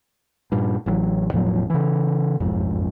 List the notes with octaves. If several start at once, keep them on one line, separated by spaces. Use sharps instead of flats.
G2 A#2
A1 G2 E3 F#3
E1 A2 F3 F#3
C#3 E3
F#1 B1 F2 G#2